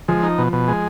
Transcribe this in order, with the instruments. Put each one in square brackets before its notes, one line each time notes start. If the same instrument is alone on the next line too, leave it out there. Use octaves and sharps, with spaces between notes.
[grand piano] F3 [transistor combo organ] G#3
[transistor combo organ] D#4
B2
B2
G#3